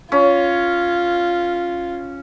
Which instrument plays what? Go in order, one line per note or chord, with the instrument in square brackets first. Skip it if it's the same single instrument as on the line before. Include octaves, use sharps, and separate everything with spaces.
[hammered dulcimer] C#4 [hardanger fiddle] F4